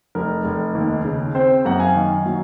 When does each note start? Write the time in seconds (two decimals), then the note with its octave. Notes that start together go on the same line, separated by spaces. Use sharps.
0.15 F1 A#4
0.45 F1
0.75 D#2
1.05 C#3
1.35 C4 C5
1.65 F#2 F#5 A#5
1.80 F5 G#5
1.96 D#3
2.26 F#3